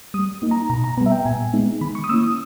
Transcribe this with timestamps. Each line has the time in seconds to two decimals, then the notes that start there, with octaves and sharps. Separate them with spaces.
0.14 G3 D#6
0.42 A#3 D#4
0.51 A#5
0.70 B2 A#5
0.84 A#5
0.98 B3 A#5
1.01 G3
1.06 E5
1.12 G5
1.25 A#2 G#5
1.53 G#3 B3 D#4
1.81 D#3 B5
1.95 C#6
2.04 D#6
2.09 A#3 C#4 E4 E6
2.23 D#6